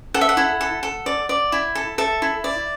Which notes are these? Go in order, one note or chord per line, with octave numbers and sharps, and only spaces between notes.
A4 F#5
E5
F#5
E4
A4
A4
D5
D5
E4
A4
A4 E5
E4
D5